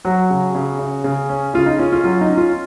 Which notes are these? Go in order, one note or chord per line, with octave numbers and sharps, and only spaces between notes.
F#3 F#4
C#3
C#3
C#3
C#3
C#4
C#3 F4
D#4
C#4 F4
F4
F#3 F4
D#4
C#4
F4